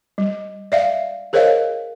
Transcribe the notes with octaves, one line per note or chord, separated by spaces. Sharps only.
G3
D5 E5 F5
G#4 A#4 C5 C#5 D#5 F5